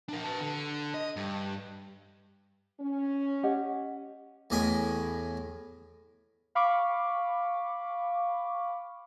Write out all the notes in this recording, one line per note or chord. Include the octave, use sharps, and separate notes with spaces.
D4 A#4
B4 A5
D3
D#5
G2
C#4
G4 D#5 F#5
E2 A2 D#5 G#5 B5
F5 B5 C#6 D6